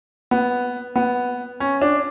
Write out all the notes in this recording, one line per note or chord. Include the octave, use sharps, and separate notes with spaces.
B3
B3
C#4
D4